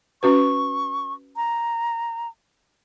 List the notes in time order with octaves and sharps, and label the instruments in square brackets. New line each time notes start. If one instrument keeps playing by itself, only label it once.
[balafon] C#4 F#4 B4 [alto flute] C#6
[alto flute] A#5